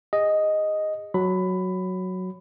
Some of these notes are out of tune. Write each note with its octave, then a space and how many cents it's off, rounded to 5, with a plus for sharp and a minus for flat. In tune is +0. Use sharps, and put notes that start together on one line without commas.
G#4 -35 D#5 +0
F#3 +0 B5 +15